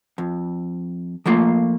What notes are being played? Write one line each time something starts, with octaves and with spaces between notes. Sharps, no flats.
F2
F3 A3 A#3 F4